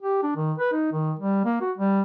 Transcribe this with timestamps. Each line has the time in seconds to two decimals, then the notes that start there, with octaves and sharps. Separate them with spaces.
0.02 G4
0.23 D4
0.36 D#3
0.58 B4
0.72 D#4
0.92 D#3
1.19 G3
1.45 A#3
1.61 F#4
1.77 G3